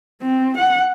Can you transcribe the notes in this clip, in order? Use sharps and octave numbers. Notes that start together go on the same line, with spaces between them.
C4
F#5